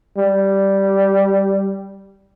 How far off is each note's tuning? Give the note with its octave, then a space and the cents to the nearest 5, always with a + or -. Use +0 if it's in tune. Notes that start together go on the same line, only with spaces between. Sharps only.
G3 -5